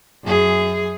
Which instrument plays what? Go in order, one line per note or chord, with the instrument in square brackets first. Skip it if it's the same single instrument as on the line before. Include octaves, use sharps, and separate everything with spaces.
[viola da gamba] F#2 G#4